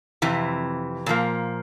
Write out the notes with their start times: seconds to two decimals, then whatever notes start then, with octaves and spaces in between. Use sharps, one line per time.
0.22 F2 C3 E3
1.06 A#2 F3 A#3